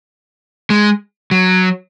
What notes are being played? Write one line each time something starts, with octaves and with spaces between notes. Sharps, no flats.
G#3
F#3